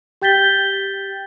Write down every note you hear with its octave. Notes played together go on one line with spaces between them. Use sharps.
G4 G5 G6 A6 B6 G7